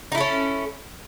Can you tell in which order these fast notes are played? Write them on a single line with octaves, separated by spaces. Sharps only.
D#4 E4 A4 C#4